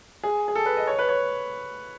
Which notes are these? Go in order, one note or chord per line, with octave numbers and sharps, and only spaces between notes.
G#4
G#4
A4
B4
D#5
C#5
B4
C#5